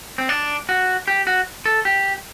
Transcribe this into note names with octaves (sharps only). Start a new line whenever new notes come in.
C4
D4
F#4
G4
F#4
A4
G4